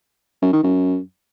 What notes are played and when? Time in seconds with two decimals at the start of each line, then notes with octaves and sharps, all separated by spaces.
0.42 F#2
0.53 D#3
0.63 F#2